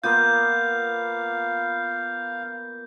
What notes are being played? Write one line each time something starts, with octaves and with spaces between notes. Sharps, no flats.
A#3 B3 F4 F5 G6